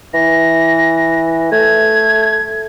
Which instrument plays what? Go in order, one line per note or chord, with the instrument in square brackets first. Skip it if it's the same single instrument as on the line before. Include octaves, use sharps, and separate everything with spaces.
[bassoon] E3 [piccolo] A#6
[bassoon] A3 [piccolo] G#6